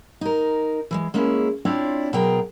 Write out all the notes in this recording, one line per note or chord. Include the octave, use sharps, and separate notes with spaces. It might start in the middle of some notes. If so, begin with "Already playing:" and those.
D#4 A#4
E3 F3 G#3
G#3 A#3 C#4 E4 F#4 G#4
C4 D4 E4 F4 C#5 D5
B2 F#3 G#4 A#4 G5 A#5